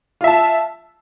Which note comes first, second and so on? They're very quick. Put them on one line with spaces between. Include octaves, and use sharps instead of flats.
F4 E5 A5